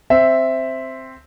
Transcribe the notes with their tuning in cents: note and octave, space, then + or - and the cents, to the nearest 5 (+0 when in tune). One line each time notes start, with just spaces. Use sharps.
C4 +0 E5 +0